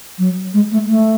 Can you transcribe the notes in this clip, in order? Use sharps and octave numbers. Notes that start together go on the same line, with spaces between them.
F#3
G#3
A3
A3